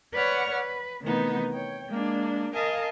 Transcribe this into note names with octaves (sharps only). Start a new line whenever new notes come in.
B4 C#5 D5 F#5 C#6 F6
B4
C3 D#3 E3 A3 B3 D#4
C#5 G5
G#3 A#3 D4
A#4 D#5 F5 G#5 A5